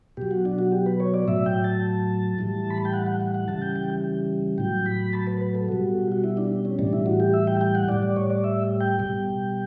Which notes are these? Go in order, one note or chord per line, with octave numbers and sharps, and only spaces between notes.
B2 F#3 G4
F#4
D4
F#4
G4
B4
C#5
D5
A2 F#3 E5
G5
A5
A2 E3 G3
B5
A5
G5
F#5
F#5
F#5
F#5
C#3 E3 G3 A5
G5
G5
A2 F#3 G5
B5
A5
B4
B4
A4
B2 G3 F#4
F#4
E4
D4
C#4
A2 E3 G3 D4
E4
F#4
G4
E5
G5
G5
F#5
A2 G3 D5
D5
C#5
D5
E5
G5
B2 G3